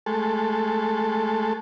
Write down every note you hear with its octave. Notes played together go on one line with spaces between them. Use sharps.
G#3 A3 A4